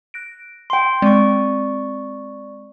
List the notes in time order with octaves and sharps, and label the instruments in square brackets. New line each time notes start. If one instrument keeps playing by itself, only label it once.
[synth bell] F#6 A#6 D7
[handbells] G5 C6
[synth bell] G#3 C4 [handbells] D5 C#6